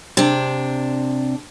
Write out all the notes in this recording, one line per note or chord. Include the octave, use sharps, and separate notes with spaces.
C3 D4